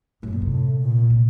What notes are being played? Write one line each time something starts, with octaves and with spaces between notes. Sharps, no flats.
F#2 A2
A#2
C3
A2
A#2
C3